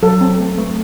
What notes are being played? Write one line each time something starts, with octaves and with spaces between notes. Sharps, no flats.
F#3 A4
C4
A3
A3